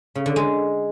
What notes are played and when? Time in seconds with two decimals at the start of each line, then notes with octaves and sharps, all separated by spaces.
0.15 C#3
0.26 D3
0.36 G#3